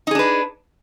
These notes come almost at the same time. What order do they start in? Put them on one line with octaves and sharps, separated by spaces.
D#4 G#4 D4 B4